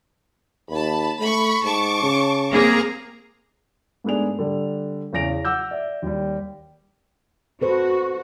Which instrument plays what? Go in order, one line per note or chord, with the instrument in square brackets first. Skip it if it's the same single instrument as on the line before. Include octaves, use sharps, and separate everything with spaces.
[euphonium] D#2 [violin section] A5 B5
[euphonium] A3 [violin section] B5 C#6
[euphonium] G#2 [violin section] A5 C#6 D6
[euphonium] C#3
[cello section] A#3 C4 G#4 [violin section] A#5
[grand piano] G#2 A3 B3 D4 G#4 F7
D3 G3
E2 C#3 G#4 A#6 D7 F7
F#5 D6 E6 G6
D5 E5
D#2 G3
[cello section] F#4 [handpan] A4 B4 C5